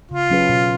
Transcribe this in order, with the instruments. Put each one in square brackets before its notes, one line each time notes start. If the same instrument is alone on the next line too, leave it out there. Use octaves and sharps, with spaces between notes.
[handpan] C#3 [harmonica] F4
[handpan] F#3 C#4 G#4 B4
B2